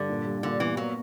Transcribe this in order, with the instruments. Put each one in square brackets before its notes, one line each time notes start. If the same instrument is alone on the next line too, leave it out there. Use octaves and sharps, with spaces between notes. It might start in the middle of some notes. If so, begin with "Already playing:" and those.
Already playing: [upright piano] G2 [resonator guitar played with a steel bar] D3
[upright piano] A#2
G3
[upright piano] A#2 [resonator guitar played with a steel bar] D3
[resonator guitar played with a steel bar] E3 [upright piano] B3
[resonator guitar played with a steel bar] F#3 [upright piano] A#3